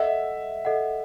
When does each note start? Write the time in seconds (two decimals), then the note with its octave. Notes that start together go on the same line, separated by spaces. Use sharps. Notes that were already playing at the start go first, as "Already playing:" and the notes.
Already playing: A4 D#5 E5 F#5
0.65 A4 D#5 F#5